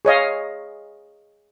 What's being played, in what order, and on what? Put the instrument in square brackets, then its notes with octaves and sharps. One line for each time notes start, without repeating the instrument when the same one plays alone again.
[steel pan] G#4 C#5 D#5 F5